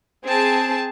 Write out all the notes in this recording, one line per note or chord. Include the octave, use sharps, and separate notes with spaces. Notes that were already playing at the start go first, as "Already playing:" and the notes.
C4 G#4 A5